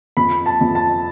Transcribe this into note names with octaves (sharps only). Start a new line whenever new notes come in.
F2 B5
A5
F2
A5